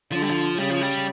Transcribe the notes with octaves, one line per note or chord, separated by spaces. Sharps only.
D3 F3
G3
F3
C#3 G3
F3
G3